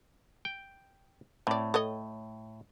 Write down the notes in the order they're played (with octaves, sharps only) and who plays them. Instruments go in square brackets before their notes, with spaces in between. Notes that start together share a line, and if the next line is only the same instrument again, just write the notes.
[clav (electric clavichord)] G5
[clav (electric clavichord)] A2 [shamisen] C4 D5
[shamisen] A4 C#5 D#5